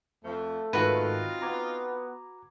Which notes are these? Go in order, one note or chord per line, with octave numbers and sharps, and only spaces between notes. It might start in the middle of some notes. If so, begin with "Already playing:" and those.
F2 F3 A3
G#2 D#3 C4 D#4 F4 F#4 B4
B3 A#5 D6 G#6